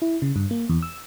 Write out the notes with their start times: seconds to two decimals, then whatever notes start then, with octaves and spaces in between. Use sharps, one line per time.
0.02 E4
0.22 C#3
0.36 G2
0.51 A#3
0.69 E2
0.82 E6